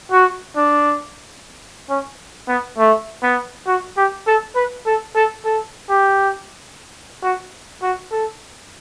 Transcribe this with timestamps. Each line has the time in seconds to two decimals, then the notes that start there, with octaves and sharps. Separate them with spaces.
0.12 F#4
0.56 D4
1.90 C#4
2.48 B3
2.78 A3
3.23 B3
3.67 F#4
3.97 G4
4.27 A4
4.55 B4
4.86 A4
5.15 A4
5.45 A4
5.89 G4
7.23 F#4
7.82 F#4
8.11 A4